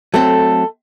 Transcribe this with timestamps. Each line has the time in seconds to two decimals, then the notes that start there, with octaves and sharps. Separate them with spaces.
0.14 F#3 A3 C4 A4